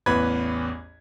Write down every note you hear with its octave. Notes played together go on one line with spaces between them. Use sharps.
A1 E2 B4 B5 G#6